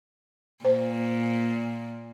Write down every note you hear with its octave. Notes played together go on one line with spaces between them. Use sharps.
A#2 C5